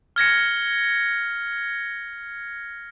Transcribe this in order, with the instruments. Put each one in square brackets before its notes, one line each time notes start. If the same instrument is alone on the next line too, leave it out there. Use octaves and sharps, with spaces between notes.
[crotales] F6 G#6 A#6 C#7